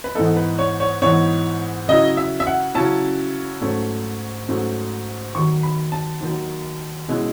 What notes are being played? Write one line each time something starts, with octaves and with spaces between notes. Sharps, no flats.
B4
G#2 E3 B3 D#4 A4
B4
C#5
C#5
G#2 E3 B3 D#4 C#5
C#3 F#3 C#4 E4 D#5
E5
E5
F#5
C#3 F#3 C#4 E4 A5
G#2 F#3 A3 C#4
G#2 F#3 A3 C#4
D#2 D#3 F#3 C#6
B5
A5
D#2 D#3 F#3
B2 G#3 C#4 E4